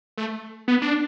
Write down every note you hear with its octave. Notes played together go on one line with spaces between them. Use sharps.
A3
B3
D4